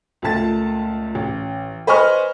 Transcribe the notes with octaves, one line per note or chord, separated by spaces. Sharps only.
C#2 A#2 A3 A5 A6
A1
B4 C5 D#5 G#5 C#6 F6